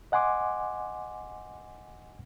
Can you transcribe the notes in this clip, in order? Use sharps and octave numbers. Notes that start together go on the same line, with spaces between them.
D#5 F#5 G#5 C6 D6